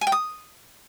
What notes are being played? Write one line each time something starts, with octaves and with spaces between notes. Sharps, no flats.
G#5
G5
D#6